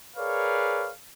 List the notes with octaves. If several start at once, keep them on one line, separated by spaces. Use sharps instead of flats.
G#4 A#4 B4 C#5 D5 F5